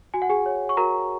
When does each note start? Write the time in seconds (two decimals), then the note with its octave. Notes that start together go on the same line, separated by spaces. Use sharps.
0.14 F#4 G#5
0.22 F#5
0.30 G#4 G#5
0.46 C#5
0.69 C#6
0.77 F#4 A#4 A#5